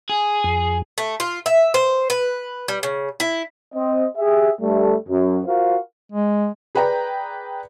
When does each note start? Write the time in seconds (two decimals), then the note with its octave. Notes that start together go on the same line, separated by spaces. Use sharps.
0.09 G#4
0.44 F2
0.98 A3
1.20 F4
1.46 E5
1.74 C5
2.10 B4
2.68 G3
2.83 C#3
3.20 E4
3.75 C4 D#5
4.18 G4 G#4 E5
4.61 G2 G3 A3
5.09 F#2
5.46 F4 F#4 A#4 C5 F5
6.12 G#3
6.75 G#4 B4 D5 G5 A#5